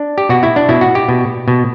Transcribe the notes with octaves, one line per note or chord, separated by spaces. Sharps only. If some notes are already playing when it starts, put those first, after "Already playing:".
Already playing: D4
G4
B2 F#4
E4
D4
B2 E4
F#4
G4
B2
B2